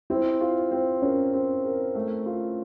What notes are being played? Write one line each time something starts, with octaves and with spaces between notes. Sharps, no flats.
C4 E4
F4
C4
C#4 A#4
C4
A#4
A3
F4